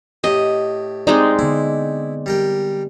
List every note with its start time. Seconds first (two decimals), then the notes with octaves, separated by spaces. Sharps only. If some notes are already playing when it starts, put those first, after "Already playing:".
0.24 A2 G4 D#5
1.07 G#3 C4 D#4 D5
1.39 D3 B3 E4
2.26 G3 A#4 G5